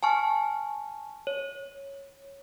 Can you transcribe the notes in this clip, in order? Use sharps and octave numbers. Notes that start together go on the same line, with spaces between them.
G#5 A5 C#6 F6
C#5